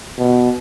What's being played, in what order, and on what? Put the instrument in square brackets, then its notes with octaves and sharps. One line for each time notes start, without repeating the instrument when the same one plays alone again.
[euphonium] B2